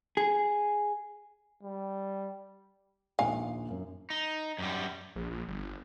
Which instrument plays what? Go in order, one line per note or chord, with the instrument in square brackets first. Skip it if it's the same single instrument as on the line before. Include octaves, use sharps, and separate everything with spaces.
[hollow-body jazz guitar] G#4
[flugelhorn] G3
[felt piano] A#1 D#2 [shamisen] F5 G#5
[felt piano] F#2
[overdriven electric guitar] D#4
F#2 G3
[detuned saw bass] A#1
A#1
G1